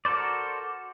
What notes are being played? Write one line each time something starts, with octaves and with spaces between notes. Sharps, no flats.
F#4 A4 A#4 C5 D5